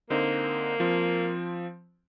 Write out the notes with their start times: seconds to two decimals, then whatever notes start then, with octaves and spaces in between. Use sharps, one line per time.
0.10 D3 A#3 C4 D#4
0.80 F3 C4